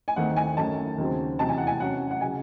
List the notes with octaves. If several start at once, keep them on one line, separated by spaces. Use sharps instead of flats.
G#5
D#2 D#3 A3 C4 F#5
G#5
F#2 D#3 A3 C#4 A5
D#2 C#3 F#3 C4
E2 C3 F#3 A5
G#5
F#5
G#5
C3 F#3 C#4 F#5
F#5
C#3 F#3 G#5